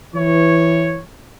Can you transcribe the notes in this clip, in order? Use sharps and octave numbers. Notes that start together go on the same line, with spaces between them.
E3 C#5